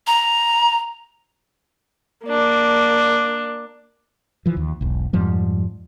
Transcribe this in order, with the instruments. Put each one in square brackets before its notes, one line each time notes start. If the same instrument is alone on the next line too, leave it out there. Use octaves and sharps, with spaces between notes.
[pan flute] A#5
[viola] A#3 D4
[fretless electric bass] E3 F3
D#2
E1 B1
F2 G#2 F3 G3